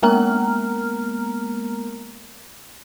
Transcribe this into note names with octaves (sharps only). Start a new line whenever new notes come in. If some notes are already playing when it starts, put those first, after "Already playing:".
G#3 A#3 B3 A#4 A#5 F6